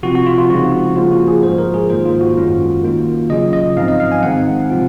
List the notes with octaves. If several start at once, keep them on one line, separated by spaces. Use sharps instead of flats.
C3 F3 C4 F4 F#4
F#4
F4
F4
C#3 F3 G#3 C4 D#4 F#4
C#3 F3 A#3 F4
F#4
G#4
G#2 F3 G#3 C5
A#4
G#4
G#2 D#3 A#3 F4 C5
F4
F#4
F#2 D#3 G#3 C#4 F4
D#3 A#3 F4
C#3 F#3 C#4 F4 D#5
D#5
G#2 F3 C4 D#4 F5
D#5
F5
G#5
D#3 G#3 C4 D#4 F#5
C3 F3 C4 F4